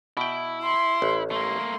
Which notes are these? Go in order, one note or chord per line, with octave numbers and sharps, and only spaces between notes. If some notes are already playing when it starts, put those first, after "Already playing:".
B2 E4 G5
C6
A1
A3 A#3 C6